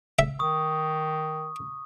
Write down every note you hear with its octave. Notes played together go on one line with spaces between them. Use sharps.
E5
D#3 C#6 D#6